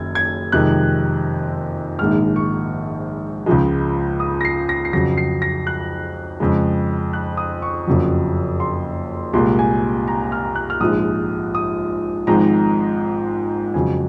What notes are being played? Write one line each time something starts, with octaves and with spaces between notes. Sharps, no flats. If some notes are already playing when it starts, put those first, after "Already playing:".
Already playing: F#1 F#2 D#3 G#6
G#6
F2 C3 D#3 G#3 F#6
A#1 G#2 D#3 G#3 F6
C#6
C#2 C#3 F3 G#3
D#6
A#6
C7
A#6
C7
F2 C#3 F#3 A#6
C7
A#6
F#6
F2 C#3 G#3
F#6
D#6
C#6
F#1 F2 C#3 F#3
C6
C2 A#2 G#3 C6
G#5
A#5
F6
F#6
F6
A#1 G#2 F3 G#3 D#6
D#6
G#1 G#2 F3 G#3 A#5
F2 C#3 F#3 G#5